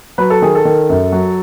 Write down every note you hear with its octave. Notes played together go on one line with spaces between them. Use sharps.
F#3 B4
A4
D#3 G#4
A4
D#3
F#2
F#3